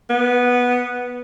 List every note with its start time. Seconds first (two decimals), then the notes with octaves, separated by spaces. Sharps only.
0.10 B3